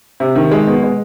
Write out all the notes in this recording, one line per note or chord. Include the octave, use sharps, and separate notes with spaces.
C3
D#3
G#3
B2
G#3